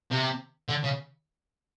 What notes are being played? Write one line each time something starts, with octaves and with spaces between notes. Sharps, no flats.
C3
D3
C#3